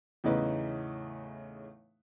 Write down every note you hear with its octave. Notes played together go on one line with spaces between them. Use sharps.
E2 A2 C#3 D#4 E4 B4